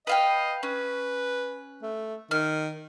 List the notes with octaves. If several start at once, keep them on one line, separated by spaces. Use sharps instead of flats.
B4 D#5 F5 G5
C#4 B4
A3
D#3 F6